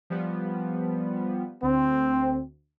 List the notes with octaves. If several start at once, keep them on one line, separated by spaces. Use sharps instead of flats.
F3 G3 B3
D2 C4